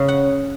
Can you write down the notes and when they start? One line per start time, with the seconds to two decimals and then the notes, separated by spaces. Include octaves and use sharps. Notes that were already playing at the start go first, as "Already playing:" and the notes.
Already playing: C#3
0.08 F#5